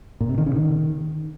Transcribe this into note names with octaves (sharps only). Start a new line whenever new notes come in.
A#2
C3
D#3
C#3
D#3